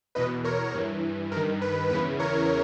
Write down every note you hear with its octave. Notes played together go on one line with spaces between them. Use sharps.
E2 B2 B4 D#5
A#4 C#5
G2 E3
G2 D#3 A#4
B4
E2 C#3 E3 B4
A#4 C#5